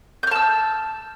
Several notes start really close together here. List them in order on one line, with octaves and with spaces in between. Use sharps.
G6 F6 A5 E6